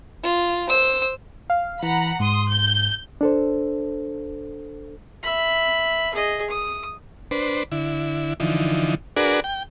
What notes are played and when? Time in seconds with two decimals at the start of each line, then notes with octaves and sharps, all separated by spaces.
0.23 F4
0.69 C5 E6
1.50 F5
1.83 E3 F#5 A#5 B5
2.20 G#2 C6 D#6
2.48 G6
3.21 D4 A4 C5
5.23 E5 B5
6.14 G#4 D#5
6.50 D#6
7.31 D4 B4 C5
7.72 D3 E4
8.40 D3 E3 F3 D#4
9.17 D4 F#4 G#4 A#4 B4 D5
9.44 G5